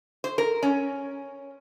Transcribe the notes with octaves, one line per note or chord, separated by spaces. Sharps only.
C5
A#4
C#4